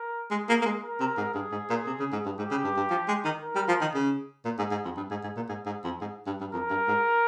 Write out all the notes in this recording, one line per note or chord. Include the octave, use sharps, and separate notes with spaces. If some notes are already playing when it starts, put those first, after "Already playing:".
Already playing: A#4
G#3 G#4
A#3
A#3
G#3
A#4
C3
G#2
G2 G#4
G#2
A#2
C3
C#3
G#2
G2
G#2 G4
C#3
G2
G2
F3
G#3
D#3
A#4
G3
F3
D#3
C#3
A#2
G#2
G#2
F2
G2
G#2
G#2
A#2
G#2
G#2
F2
G#2
G2
G2
F2 A#4
G2
G#2